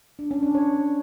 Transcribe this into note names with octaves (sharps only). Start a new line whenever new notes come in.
D4
C#4
D4
C#5